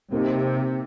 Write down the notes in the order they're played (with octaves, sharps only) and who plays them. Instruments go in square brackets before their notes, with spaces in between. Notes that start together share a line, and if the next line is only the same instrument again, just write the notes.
[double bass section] C3 [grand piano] A#3 D#4 G4